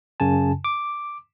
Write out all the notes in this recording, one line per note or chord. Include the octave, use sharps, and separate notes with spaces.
F#2 C#3 G#5 A5
D6